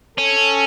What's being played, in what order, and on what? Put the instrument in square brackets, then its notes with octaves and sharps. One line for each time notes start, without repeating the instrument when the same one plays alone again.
[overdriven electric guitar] C#4 [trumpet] A4